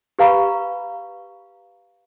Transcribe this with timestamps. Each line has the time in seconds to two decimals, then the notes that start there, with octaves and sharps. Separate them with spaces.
0.19 G4 B4 F5 A#5 B5 C#6